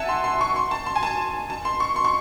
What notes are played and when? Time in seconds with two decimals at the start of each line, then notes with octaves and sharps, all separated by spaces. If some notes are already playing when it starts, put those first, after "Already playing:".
Already playing: E5 F#5 G#5 A5
0.09 C6
0.24 C6
0.41 C#6
0.56 C6
0.71 A5
0.86 C6
0.96 G#5
1.03 A5
1.50 A5
1.65 C6
1.80 C#6
1.96 C6
2.04 C#6